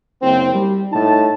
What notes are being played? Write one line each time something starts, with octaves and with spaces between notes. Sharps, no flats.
F#1 C4
G3
A2 D#4 A5